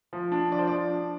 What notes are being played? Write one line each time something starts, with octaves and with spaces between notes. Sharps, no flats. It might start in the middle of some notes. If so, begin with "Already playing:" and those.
F3
D4
F3 D5
C5
F3 D5
D4